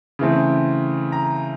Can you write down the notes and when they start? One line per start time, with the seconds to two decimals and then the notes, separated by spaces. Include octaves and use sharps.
0.19 C#3 E3 A3 C4
1.12 A#5